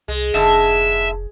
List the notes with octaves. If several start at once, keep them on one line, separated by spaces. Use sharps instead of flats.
C2 G#3
F1 G#2 D3 E5